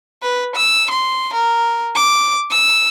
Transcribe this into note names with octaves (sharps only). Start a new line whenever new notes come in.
B4
E6
C6
A#4
D6
E6